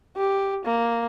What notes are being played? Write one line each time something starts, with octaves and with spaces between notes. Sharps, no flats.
G4
A#3